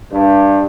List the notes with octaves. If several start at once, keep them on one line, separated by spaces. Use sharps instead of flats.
G2